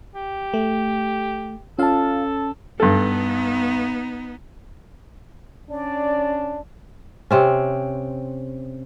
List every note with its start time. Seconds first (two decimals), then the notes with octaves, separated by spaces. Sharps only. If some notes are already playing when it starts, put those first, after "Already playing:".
0.15 G4
0.54 A3
1.79 C#4 F4 A4 F5 A5
2.80 G2 B3 D#4 A4
5.71 C#4 D4 D5
7.31 C3 C4 C#4